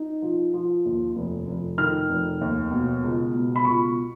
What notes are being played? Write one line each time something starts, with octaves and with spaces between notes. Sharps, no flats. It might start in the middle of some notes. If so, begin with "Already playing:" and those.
Already playing: D#4
F3
F3
D#2
F1
F1
D#3 F6
F1
D#2
B2
C#2
B2
B5
C#2 C#6